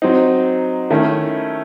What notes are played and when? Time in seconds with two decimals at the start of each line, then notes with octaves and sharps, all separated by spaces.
0.02 F#3 C4 D#4
0.90 D#3 A3 C#4 E4